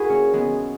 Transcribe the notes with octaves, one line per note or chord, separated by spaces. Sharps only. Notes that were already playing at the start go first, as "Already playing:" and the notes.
Already playing: E4 F#4 G#4 A#4
A#3 C#4
G#3 B3